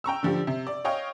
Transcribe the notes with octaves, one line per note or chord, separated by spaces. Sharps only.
G5 A#5 C#6 E6
D3 F3 G4
C3
D5
C#5 D#5 F5 G5 C#6